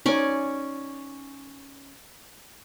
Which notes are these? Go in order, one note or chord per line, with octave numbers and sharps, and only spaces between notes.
C#4 D#4 C#5 D5 G#5